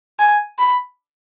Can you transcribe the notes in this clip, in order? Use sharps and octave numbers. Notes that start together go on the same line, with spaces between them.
G#5
B5